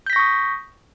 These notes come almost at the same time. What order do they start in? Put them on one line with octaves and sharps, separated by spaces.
G6 B6 A#6 C#6 D#6